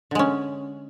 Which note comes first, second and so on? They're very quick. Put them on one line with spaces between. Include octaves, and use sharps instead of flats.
D3 G#3 C#4